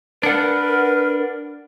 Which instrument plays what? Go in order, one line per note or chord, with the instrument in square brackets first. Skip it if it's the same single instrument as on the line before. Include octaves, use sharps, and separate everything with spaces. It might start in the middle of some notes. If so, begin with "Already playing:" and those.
[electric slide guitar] D4 F#5 [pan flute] A#4 [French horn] B4